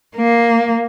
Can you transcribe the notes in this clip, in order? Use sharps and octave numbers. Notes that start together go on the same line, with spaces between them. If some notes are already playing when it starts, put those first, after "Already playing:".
A#3